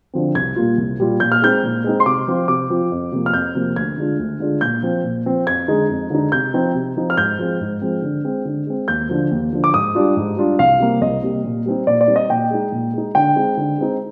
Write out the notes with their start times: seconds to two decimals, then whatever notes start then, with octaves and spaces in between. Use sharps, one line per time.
0.13 D3 F3 C4
0.35 C2 G#6
0.56 A#2 G3 A#3 F4
0.78 C2
0.98 A#2 G3 A#3 F4
1.20 A#2 G6
1.32 F6
1.42 G#3 C4 D#4 G6
1.64 A#2
1.84 G#3 C4 D#4
2.00 C6
2.06 C3 D6
2.27 F3 C4 F4
2.48 C3 D6
2.70 F3 C4 F4
2.92 F2
3.12 C3 F3 A#3
3.26 F6
3.33 F2 G6
3.55 C3 F3 A#3
3.76 D2 G#6
3.98 D3 G#3 D4 F4
4.19 D2
4.40 D3 G#3 D4 F4
4.61 A#2 G6
4.83 F3 C4
5.04 A#2
5.26 F3 C4
5.47 F2 G#6
5.68 D3 G#3 D#4
5.90 F2
6.10 D3 G#3 D#4
6.32 C3 G6
6.54 F3 C4 D#4
6.75 C3
6.96 F3 C4 D#4
7.10 F6
7.17 G#2 G6
7.39 F3 G#3 C4
7.61 G#2
7.82 F3 G#3 C4
8.02 D3
8.24 G#3 C4
8.45 D3
8.67 G#3 C4
8.88 D#2 G6
9.09 D3 F3
9.31 D#2
9.53 D3 F3
9.64 D6
9.74 G#2 D#6
9.95 G3 D4 F4
10.17 G#2
10.37 G3 D4 F4
10.59 C2 F5
10.80 C3 G3 A#3
11.01 C2 D#5
11.23 C3 G3 A#3
11.44 A#2
11.66 G3 C4 D#4
11.87 A#2 D5
12.01 D5
12.08 G3 C4 D#4
12.16 D#5
12.29 A#2 G5
12.51 G#3 D#4
12.72 A#2
12.94 G#3 D#4
13.15 D3 G5
13.36 G#3 C4 D#4
13.57 D3
13.78 G#3 C4 D#4